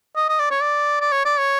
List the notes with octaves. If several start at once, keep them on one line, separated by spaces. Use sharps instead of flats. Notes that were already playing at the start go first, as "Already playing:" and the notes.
D#5
D#5
D5
C#5
D5
D5
C#5
D5
C#5